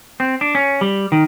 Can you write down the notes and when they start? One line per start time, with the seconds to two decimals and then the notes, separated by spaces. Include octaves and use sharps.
0.20 C4
0.41 D4
0.55 C#4
0.81 G3
1.12 D#3